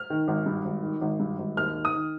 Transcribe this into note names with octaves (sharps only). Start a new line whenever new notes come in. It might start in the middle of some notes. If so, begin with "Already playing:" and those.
Already playing: F6
D#3
G#1
G2
G#1
D#3
G#1
G2
G#1
D#2 F6
D#3
D#6
D#3